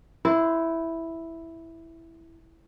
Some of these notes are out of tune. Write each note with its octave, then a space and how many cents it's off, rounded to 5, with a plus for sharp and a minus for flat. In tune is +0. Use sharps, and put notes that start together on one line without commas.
E4 +0 C5 -25